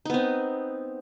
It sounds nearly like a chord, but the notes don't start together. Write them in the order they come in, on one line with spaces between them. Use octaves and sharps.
D#4 B3 C4